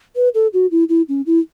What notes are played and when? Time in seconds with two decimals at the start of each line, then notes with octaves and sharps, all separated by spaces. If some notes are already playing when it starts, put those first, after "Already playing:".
0.16 B4
0.35 A4
0.54 F#4
0.71 E4
0.89 E4
1.09 C#4
1.26 E4